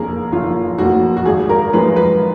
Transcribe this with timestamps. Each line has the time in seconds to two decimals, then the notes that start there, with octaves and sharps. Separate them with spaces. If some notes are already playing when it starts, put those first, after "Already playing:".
Already playing: F#1 F2 F3 A#3 G#4 A#4
0.32 F#1 F4
0.78 F2 F3 A#3 F#4
1.17 F#4
1.25 G#1 G#4
1.49 A#4
1.73 F#2 F3 G#3 B4
1.96 B4